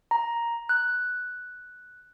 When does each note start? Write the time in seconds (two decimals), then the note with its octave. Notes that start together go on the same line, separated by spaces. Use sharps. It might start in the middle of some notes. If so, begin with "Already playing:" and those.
0.11 A#5
0.69 F#6